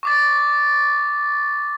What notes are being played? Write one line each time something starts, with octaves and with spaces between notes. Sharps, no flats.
C#6 D6 A6